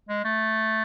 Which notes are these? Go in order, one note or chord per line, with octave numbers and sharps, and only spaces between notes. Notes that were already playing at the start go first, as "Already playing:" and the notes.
G#3
A3